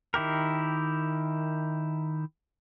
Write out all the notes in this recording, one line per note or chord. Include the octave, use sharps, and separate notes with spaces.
D#3 E4 G4 A#4